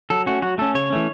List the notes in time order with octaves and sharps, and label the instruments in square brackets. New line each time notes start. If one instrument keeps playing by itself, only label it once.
[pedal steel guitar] F#3 A4
A3 C#4 F#4
F#3 F#4
A3 C#4 A4
C#3 C#5
E3 A3 C#4